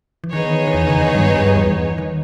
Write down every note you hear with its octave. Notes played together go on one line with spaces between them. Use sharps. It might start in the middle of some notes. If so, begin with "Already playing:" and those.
E3
D#3 B3 D#4 G#4 C#5
D#3
E2 E3
C#3
D#3
G2 G3
G2 G3
G3
E2 E3
D#3